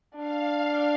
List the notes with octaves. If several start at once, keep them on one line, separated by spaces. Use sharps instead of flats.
D4 F5